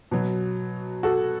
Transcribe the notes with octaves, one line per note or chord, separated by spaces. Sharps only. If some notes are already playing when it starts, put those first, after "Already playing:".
B2 F#3
F#4 A4